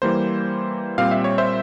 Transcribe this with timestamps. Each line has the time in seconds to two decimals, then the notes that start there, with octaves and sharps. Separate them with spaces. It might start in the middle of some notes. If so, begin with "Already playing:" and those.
0.02 E3 G3 A#3 C5
0.98 A#2 G3 C4 F5
1.11 E5
1.24 C#5
1.38 C5 E5